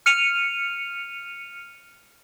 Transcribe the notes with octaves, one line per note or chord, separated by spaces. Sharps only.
F6 C#7 D#7 F7